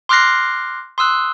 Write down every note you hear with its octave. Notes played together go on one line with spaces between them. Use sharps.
C6 D6 F6 F#6 A#6 C7
C6 D#6 E6 F#6